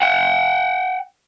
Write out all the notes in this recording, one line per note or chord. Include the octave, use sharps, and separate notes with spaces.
F#5 G5